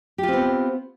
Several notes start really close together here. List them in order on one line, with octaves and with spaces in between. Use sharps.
G4 F4 C4 B3